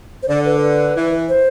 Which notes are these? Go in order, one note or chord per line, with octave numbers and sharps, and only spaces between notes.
C5
D3 D5
B4
B4
E3
C5